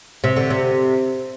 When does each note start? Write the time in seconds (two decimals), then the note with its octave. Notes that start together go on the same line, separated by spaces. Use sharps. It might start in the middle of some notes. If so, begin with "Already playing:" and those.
0.24 C3
0.36 D3
0.50 C3